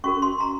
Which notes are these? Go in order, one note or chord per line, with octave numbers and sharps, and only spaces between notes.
C#4 F#4 A#4 C#6
C6
A#5